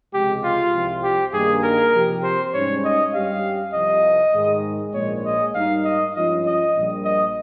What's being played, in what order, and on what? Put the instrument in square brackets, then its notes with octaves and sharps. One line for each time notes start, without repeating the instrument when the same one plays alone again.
[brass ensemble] C#2 C3 F3 G#3 [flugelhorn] G4
[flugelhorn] F4
[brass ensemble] C2 C3 F3
[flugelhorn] G4
[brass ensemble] G2 D#3 A#3 [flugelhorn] G#4
[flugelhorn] A#4
[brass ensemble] C3 F3 C4 G4
[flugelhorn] C5
[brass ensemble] G#2 G3 C#4 [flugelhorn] C#5
[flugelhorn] D#5
[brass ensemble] G2 G3 C#4 G4 [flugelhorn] F5
[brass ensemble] C2 C3 F3 [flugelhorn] D#5
[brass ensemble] G#2 D#3 G#3
[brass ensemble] A#1 A#2 F3 G#3 [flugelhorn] C#5
[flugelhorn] D#5
[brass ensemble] G#2 G3 A#3 D#4 [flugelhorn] F5
[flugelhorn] D#5
[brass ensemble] G2 F3 G#3 C#4 F4 [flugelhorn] D#5
[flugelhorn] D#5
[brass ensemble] A#1 A#2 G3
[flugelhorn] D#5